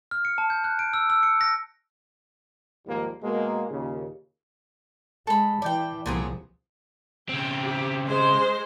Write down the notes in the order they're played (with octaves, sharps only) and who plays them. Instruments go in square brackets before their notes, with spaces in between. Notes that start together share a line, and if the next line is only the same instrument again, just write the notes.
[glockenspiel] F6
C#7
A5
G6
F#6
D7
E6
E6
C#7
A#6
[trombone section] D#2 G#2 F3 G3 A#3
B2 G#3 A#3
D#2 A#2 C#3
[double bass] G#3 [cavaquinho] A4 B5
[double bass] E3 [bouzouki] D5 G5
[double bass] C2 F3 [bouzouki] A#2 B3 G#4
[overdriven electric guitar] C#3 C4 [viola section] G5
[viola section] G4
G#3 C5